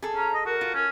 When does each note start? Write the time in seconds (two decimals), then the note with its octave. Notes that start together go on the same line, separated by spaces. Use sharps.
0.02 G#4 A4
0.15 C#4 A#5
0.34 D#5
0.46 F#4 A#4
0.61 F4
0.75 C#4